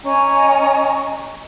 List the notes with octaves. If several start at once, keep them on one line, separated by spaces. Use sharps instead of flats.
C#4 D#5 G#5 A#5